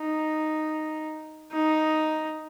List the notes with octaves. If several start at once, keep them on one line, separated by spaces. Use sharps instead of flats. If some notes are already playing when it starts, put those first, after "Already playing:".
Already playing: D#4
D#4